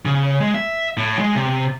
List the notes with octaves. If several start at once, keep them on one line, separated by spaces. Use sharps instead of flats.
C#3
G#3
E5
A2
G#3
C3